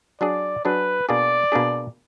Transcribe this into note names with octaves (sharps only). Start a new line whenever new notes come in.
F#3 D4 G#4 D5
F#3 D4 G#4 B4
B2 A#3 D4 G#4 D5
B2 A#3 D4 G#4